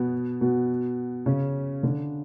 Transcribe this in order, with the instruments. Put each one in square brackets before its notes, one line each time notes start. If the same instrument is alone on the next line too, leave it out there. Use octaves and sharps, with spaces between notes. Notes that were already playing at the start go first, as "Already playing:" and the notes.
Already playing: [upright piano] B2 B3
B2 B3
C#3 C#4
D3 D4